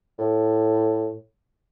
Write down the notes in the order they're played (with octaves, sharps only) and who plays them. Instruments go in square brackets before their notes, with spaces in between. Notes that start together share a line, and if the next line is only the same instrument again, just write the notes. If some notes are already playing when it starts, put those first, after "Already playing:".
[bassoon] A2